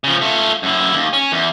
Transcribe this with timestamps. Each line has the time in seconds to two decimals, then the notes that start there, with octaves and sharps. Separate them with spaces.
0.04 C#3 F3
0.21 A3 F4
0.63 F#2 E4
0.95 D#2
1.13 C#4
1.32 E2